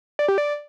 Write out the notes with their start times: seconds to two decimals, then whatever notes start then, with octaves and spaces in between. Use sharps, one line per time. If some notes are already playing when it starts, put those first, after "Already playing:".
0.19 D5
0.28 G4
0.38 D5